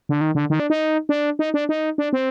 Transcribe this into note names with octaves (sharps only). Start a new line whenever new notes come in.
D3
D#3
D3
D#3
D4
D#4
D4
D#4
D4
D#4
D4
C4